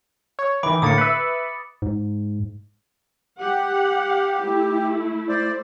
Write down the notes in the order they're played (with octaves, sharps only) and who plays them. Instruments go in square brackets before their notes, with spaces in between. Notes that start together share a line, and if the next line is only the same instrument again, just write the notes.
[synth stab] C#5
[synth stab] D#3 E3 [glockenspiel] B5 D6 D7
[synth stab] A2 D3 A#3 [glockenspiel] D#6 A6 C#7
[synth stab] B4 E5
[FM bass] G#2
[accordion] G4 [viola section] F#5
[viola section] A3 E4
[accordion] C5 D5